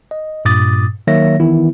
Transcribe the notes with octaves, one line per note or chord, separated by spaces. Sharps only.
D#5
G2 A#2 D6 D#6 A6
D#3 F#3 A#3 C#5 E5 A#6
D#3 E3 B3 E4